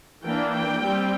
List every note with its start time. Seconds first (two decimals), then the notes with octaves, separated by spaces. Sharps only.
0.23 E3 A#3 D4 G5
0.52 G5
0.80 G3 C4